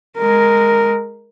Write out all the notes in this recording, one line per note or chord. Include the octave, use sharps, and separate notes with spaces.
G#3 A#4